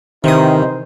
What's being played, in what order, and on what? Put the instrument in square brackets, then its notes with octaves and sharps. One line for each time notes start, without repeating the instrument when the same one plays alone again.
[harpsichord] C3 D#6 [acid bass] D#3 [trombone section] E3 D#4 C5